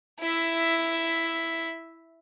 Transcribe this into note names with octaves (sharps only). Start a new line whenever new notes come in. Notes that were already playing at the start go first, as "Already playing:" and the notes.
E4 E5